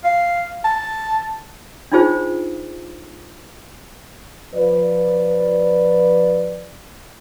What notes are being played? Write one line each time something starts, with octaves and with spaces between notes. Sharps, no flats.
F5
A5
D4 D#4 F4 G#4 C5
F3 B4 D5